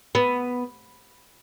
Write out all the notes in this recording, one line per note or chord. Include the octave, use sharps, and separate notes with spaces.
B3